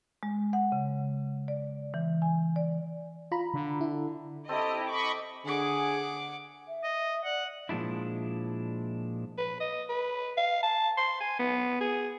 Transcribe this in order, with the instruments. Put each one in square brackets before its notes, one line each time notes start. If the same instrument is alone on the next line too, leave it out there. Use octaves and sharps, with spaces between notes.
[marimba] G#3
F#5
C#3
D5
E3
G#5
D5
[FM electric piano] F4 A#5 B5
[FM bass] D3
[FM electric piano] E4
[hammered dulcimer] C4 A4 [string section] E4 G4 D#5
[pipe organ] D#5 B5 C#6 [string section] D6
[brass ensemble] D3 G#4 [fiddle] F#5 D6
[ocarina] E5
[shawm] D#5
[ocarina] D5 [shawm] F#5
[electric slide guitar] A#2 F3 G#3 D4 E4
[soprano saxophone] B4
D#5
B4
F5
A5
C6
G#5
B3
G#4